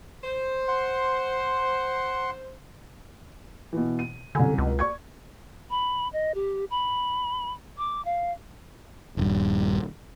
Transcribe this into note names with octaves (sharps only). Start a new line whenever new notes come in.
C5
F#5 C6
B2 E3
D#7
C2 F#2 D3 G#5
C#2
D5 C#6 G#6
B5
D#5
G4
B5
D6
F5
D#1 G2